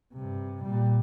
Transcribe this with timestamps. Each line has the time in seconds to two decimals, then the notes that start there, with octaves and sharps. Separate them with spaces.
0.13 G2 C3
0.64 A#2 G3